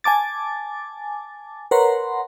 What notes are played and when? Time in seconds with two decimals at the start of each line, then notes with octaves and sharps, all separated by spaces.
0.04 G#5 A5 D6 A6
1.71 A#4 B4 C#5 F#5 A#5 C6